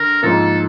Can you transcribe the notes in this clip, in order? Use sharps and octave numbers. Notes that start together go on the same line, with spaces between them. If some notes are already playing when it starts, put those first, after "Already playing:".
Already playing: D3 A#4
G#2 F3 A#3 A4